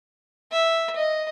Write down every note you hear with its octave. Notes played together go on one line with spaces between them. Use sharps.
E5
D#5